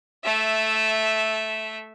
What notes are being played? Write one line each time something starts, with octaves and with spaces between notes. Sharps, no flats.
A3 E5